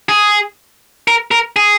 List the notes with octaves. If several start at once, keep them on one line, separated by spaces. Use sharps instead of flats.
G#4
A#4
A#4
G#4